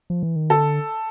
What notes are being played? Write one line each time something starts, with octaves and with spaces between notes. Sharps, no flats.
F3
E3
D#3
D3 A4